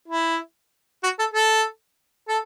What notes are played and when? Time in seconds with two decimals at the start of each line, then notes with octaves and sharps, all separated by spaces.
0.08 E4
1.03 F#4
1.19 A4
1.34 A4
2.28 A4